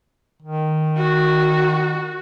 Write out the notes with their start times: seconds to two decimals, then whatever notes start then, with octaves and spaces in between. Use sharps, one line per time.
0.42 D#3
0.97 F#4